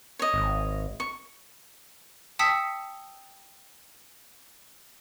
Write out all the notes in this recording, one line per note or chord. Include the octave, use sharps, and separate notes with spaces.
C#5 D#5
G#1
C#6
G5 A5 D#6 E6 B6 C#7